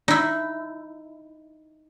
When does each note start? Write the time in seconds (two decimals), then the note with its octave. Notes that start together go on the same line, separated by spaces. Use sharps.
0.08 D#4 E4